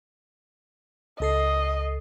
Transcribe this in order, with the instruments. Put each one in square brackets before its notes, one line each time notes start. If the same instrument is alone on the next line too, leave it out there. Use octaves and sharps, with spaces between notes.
[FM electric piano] C#2 A4 C7 [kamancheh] D#5